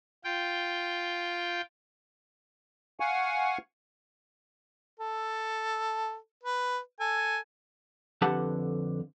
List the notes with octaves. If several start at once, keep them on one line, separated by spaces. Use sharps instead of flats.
F4 G5
F5 F#5 G#5 C#6
A4
B4
A4 G#5
F2 D3 G4 B4 F#5 A5